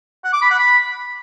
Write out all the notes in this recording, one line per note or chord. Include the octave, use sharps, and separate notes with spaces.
F#5
D6
B5
F#5
B5